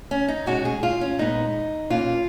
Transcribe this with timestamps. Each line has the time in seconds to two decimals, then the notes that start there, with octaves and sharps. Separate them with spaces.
0.11 C#4
0.28 D#4
0.46 B2 G#3 C#4 F#4
0.65 G#4
0.83 F4
1.01 C#4
1.18 A#2 G#3 B3 D#4
1.90 B2 A#3 C#4 F4